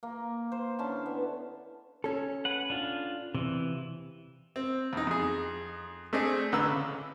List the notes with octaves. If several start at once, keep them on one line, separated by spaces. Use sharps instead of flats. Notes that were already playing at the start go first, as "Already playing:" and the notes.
A#3
C5
D3 C#4 E4 A5
B3
C#4 A4
B4 F#5
D4 F4
C3 E3
C4
E2 D#4
F2 G#4
A3 C4 D4 G#4 D#5
A1 D3 B4 A#5 E6
C#3